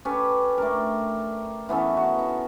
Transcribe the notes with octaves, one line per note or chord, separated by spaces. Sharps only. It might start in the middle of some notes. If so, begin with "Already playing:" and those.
C#4 G4 A4 B4
A3 D4 A#4
E3 B3 C#4 A4
D#4 F#4
D#4